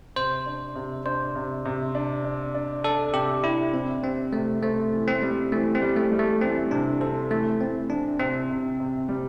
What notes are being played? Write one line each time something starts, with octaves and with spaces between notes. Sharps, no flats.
C3 C5
D4
C3
D4 C5
C3
C3
D4
D4
D4
D4 A4
C3 G4
D4 E4
C3 C4
G3 C4
C3 A3
A3 C4
E3
C4
G3
E3 A3
C4
G3
A3
G3
A3
E3 C4
C3 D4
C4 A4
E3 A3
C4 E4
E3 D4
C3 C4
C3
C3
G3